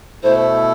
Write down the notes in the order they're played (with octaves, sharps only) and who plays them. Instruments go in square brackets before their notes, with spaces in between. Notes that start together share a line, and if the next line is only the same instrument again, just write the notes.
[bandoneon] B2 A3 E4 A4 [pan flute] C5